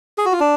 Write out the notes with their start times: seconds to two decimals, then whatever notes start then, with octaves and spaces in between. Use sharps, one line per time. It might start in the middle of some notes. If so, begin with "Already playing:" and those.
0.18 G#4
0.26 F#4
0.32 F4
0.40 D4